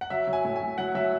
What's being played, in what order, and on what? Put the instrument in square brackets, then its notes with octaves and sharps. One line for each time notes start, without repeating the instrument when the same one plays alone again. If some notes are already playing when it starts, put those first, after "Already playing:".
[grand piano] F#5
F#3 E5
F#3
G#5
A2
G#5
F#3
F#3 F#5
F#3 E5